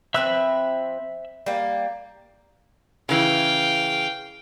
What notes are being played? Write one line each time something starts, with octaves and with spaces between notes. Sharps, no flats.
F3 C4 B4 E5 E6 F#6
G3 A#3
C#3 E3 F5 G5